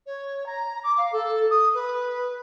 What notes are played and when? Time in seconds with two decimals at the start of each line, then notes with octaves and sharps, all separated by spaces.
0.06 C#5
0.46 A#5
0.83 D6
0.97 F5
1.12 A4
1.50 D#6
1.74 B4